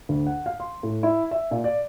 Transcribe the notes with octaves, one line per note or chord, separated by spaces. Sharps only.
D2
F#5
F5
C6
A2
E4
E5
A#2
D5